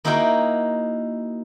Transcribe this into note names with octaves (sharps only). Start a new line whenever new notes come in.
A#3 D#4 E4 F#4 A#4 G5